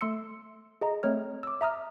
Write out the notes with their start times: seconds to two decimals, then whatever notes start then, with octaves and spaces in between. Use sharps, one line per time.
0.01 A3 C6 E6 C#7
0.81 G#4 D#5 A#5
1.03 A3 C4 C#5 F6
1.43 D6 E6
1.61 E5 A#5 D#6 F6